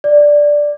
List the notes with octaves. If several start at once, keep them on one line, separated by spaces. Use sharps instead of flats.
D5